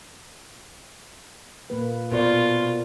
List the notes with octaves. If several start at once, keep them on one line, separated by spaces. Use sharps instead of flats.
A#2 A#3 B4
B2 F4 A#4 C5 D5